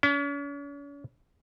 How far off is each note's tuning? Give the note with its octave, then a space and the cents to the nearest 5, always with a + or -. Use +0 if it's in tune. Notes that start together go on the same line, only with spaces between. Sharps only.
C#4 +40